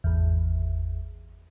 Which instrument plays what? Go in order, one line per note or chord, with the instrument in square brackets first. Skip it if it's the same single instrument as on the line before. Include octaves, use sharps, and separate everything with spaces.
[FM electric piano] G#1 E2